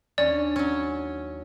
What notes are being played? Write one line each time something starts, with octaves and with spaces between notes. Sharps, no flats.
D#2 C#4 D4 D5
F#3 C#4